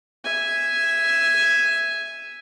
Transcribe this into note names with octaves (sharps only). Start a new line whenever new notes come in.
E5 G#5